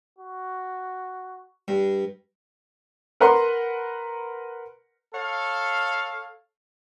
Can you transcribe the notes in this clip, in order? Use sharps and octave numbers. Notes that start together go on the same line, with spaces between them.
F#4
G2
A#4 B4 F#5 A#5 C6
A4 C#5 F5